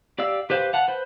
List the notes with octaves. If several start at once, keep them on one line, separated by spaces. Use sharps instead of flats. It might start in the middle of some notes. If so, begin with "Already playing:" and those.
G4 D5 F5 E6
G4 B4 C5 F5
F5 F#5 A5
B4 C5